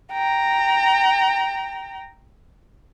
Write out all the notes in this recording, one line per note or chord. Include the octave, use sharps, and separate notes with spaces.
G5 A#5